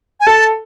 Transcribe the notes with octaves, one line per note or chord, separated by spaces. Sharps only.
G#5
A4 A5